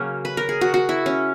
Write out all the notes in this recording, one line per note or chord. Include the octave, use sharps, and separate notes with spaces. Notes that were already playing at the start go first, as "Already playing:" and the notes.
Already playing: C#3 F#3 A#3 C#4
B4
A#4
G#4
F#4
F#4
E4
C#4